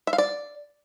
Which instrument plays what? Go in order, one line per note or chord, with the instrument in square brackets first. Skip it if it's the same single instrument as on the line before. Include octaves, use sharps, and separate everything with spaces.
[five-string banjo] E5
F5
D5